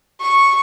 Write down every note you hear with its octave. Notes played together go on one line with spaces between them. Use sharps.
C#6